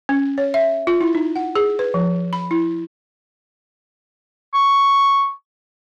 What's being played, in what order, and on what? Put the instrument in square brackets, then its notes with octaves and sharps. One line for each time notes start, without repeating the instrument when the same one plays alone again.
[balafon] C#4
C#5
E5
F4
E4
D#4
F#5
G#4
B4
F3
B5
E4
[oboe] C#6